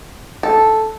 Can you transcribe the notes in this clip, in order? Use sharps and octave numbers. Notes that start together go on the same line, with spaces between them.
A4